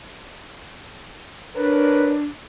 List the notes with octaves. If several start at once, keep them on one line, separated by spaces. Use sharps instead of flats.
D4 A#4 B4 C#5